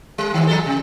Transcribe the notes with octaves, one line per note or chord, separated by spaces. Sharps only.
G3
D#2 D#3
F3 G#3 A4
C3